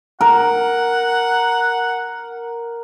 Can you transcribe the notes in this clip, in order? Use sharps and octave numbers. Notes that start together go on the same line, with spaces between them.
A#4 F#5